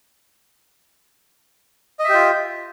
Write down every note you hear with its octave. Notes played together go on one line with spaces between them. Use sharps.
F4 G4 D#5 E5